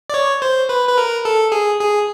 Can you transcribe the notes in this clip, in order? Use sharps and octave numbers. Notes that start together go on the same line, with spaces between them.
D5
C#5
C5
B4
B4
A#4
A4
G#4
G#4